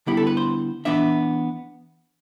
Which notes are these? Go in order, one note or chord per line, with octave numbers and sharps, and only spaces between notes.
D3 G3 B3 E4 G4
A4
B4
C5
E3 B3 D4 E5